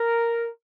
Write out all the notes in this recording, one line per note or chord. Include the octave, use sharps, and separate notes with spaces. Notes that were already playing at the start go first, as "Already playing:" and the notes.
Already playing: A#4